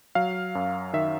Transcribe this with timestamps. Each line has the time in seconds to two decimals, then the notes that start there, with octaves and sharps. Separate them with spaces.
0.15 F#3 F5
0.55 F#2
0.93 D#3 E5